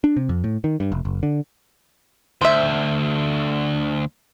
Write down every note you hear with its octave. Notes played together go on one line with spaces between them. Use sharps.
D4
C3
F2
A2
D#3
G2
F1
F#1
D3
D2 C5 E5